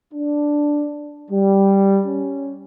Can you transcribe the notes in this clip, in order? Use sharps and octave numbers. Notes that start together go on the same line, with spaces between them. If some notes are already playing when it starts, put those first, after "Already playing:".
D4
G3
C#4